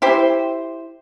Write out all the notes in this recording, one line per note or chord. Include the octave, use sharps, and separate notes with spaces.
E4 G4 C5